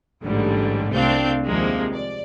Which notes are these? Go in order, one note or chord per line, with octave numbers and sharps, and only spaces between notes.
A1 G#2 D3 G3
C2 A3 C4 D4 F5 G6
D#2 C3 F3 G#3 A#3
D5